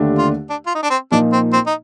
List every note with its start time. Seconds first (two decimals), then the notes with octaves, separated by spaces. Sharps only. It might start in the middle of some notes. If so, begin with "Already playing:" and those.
Already playing: D#2 D3 A3 D4 G4
0.18 F4
0.49 D4
0.66 F4
0.75 D#4
0.83 D4
0.90 C4
1.11 A#2 F3 A#3 D4 D#4
1.32 C4
1.53 C4
1.66 D#4